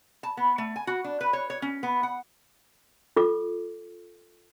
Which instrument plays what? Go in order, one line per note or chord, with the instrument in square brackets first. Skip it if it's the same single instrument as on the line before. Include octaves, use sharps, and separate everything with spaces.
[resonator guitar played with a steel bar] A5
B3
A3
G#5
F#4
D4
B4
C#5
C#5
C#4
B3
F#5
[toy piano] F4 A4 D6